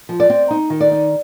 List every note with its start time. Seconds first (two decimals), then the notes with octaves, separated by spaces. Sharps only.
0.09 F3
0.20 D5
0.30 C4
0.51 D#4
0.70 D#3
0.80 D5
0.91 D#4